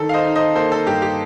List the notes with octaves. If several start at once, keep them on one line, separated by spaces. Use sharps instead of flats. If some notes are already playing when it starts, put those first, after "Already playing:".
Already playing: D#3 A4
F5
C5 D#5
D#4
C5 D#5
A#3 A4 C5
A4
G2 G4
G4